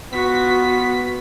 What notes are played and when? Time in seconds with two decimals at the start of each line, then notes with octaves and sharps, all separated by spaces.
0.13 B3 F4 F#4 B6